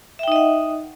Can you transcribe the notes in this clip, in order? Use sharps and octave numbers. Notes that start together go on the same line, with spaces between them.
D#4 D#5 E5 F#5 G5